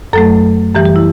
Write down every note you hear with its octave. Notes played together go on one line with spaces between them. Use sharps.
F#2 F#3 A3 A4
F#2 E3 G3 G4
G4
E4